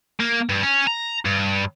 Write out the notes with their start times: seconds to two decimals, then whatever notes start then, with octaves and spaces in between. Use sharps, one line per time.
0.20 A#3
0.50 G2
0.63 C#4
0.87 A#5
1.25 G2